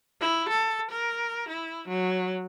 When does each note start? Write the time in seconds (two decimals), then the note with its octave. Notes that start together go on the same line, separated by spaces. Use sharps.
0.21 E4
0.49 A4
0.91 A#4
1.49 E4
1.89 F#3